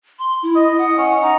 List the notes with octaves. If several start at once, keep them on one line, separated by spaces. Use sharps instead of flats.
C6
E4
D#5
F#5
C#4
D#4